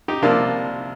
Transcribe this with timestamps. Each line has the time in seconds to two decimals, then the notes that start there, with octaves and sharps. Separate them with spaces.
0.08 D#4 G4
0.22 C2 C3 F3 A#3 D4